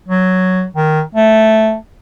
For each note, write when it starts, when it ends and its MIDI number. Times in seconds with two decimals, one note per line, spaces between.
0.08 0.65 54
0.76 1.01 51
1.15 1.75 57